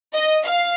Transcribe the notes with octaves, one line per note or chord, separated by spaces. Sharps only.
D#5
F5